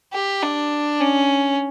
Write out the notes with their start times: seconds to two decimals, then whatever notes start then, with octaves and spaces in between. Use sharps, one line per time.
0.13 G4
0.43 D4
1.01 C#4